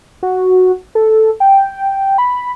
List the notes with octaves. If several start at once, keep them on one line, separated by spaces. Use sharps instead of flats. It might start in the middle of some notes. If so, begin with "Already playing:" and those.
F#4
A4
G5
B5